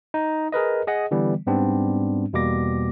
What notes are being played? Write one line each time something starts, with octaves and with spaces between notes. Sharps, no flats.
D#4
G#4 A#4 B4 D#5
G#4 D#5 F#5
D3 E3 G3 B3
G#2 G3 B3 C4 D4
E2 B2 G3 A#3 D6 A#6